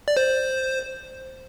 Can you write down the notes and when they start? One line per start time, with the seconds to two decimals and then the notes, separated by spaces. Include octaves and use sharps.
0.08 D5
0.17 C5